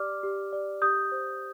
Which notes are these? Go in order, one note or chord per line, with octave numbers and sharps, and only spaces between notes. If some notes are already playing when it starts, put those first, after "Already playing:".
Already playing: G4 D5 D6 F6
G4
D5
G4 D#6 G6
C5